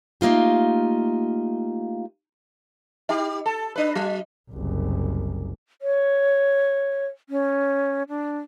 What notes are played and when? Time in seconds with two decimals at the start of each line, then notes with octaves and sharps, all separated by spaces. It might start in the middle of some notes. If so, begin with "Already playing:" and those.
0.21 A3 A#3 D#4 F4 G4
3.09 D#4 G4
3.46 A4
3.76 D4 B4
3.95 F#3
4.51 F#1 C2
5.82 C#5
7.29 C#4
8.09 D4